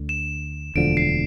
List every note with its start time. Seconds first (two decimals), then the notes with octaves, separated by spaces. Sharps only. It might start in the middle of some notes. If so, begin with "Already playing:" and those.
Already playing: D2 D3
0.09 E7
0.75 E1 D2 D3 F3 D7
0.97 C7